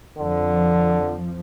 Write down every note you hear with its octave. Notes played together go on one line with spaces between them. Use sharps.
F2 D3 F3